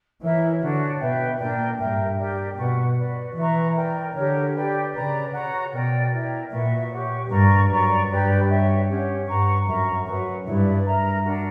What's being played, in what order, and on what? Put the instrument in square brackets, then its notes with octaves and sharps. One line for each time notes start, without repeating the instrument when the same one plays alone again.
[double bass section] E3 [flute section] E4 A#4 C#5 E5
[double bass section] D3 [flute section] D4 F#4 C#5
[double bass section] B2 [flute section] B4 E5 G5
[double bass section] A#2 [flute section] D4 A#4 D5 G5
[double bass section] G2 [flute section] A#4 E5 G5
[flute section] G4 A#4 D5 G5
[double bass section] B2 [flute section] B4 F#5 C#6
[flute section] F#4 B4 D5
[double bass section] E3 [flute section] B4 E5 A#5 C#6
[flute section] A#4 D5 G5
[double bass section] D3 [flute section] G4 A#4 C#5
[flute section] G4 B4 D5 G5
[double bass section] C#3 [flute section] B4 D5 A#5
[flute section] F#4 C#5 F#5 A#5
[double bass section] B2 [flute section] A#4 D5 G5
[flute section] E4 A#4 D5 G5
[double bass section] A#2 [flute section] F#4 B4 E5
[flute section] G4 C#5 F#5 C#6
[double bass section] G2 [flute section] A#4 D5 A#5 C#6
[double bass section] F#2 [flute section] B4 D5 A#5 C#6
[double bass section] G2 [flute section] G4 B4 D5 G5
[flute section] F#4 C#5 E5 G5
C#4 G4 C#5 F#5
[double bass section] G2 [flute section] B4 F#5 A#5 C#6
[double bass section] F#2 [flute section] A#4 E5 A#5 C#6
[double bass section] F#2 [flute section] B4 F#5 C#6
[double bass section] G2 [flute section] E4 B4 D5
[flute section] A#4 E5 A#5
D4 F#4 A#4